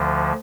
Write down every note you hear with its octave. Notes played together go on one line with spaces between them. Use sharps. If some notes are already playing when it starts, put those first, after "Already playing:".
Already playing: D2 D3 F3